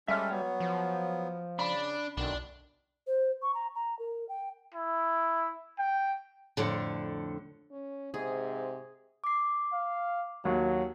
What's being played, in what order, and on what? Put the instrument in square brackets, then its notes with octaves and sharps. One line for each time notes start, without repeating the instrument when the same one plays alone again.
[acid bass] G3 [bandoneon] G#3 C#4 A4 [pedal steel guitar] E5 F6
[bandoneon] F#3 B3 [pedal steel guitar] C#5
[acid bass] F3
[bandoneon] C#3 [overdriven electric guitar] D4 [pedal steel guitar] B5
[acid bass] B1 [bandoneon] F#2 D3 D#3 [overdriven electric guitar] D4
[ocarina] C5
C#6
A#5
A#5
A#4
G5
[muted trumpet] E4
G5
[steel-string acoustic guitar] F2 A2 D3
[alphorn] C#4
[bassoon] G#2 [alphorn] C3 [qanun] G#4
[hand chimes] D6 C7
[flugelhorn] F5
[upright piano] D#2 [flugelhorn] F#3